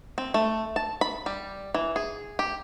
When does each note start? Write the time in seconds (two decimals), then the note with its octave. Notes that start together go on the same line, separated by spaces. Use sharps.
0.18 C4
0.34 A3
0.76 A5
1.01 B5
1.26 G3
1.74 E3
1.96 G#4
2.39 G4